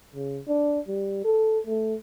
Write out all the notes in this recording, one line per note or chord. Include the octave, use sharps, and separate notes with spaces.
C#3
D4
G3
A4
A3